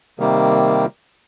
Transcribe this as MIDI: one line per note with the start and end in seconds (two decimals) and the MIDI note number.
0.19 0.86 48
0.19 0.86 51
0.19 0.86 55
0.19 0.86 58